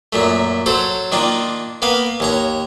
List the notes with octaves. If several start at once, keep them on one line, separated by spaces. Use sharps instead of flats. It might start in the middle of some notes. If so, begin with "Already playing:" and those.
F#2 A#2 A3
F#3 A4 C5 C#5
D#3 A#3 D4 F4
A#3 B3 F5
D#2 C#5 A#5